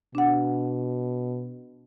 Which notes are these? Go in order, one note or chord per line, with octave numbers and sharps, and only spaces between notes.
B2 D4 F#5